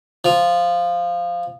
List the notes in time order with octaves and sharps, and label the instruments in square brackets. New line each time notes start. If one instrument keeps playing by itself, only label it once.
[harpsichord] F3